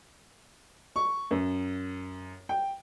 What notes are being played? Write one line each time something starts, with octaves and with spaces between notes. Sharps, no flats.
C#6
F#2
G5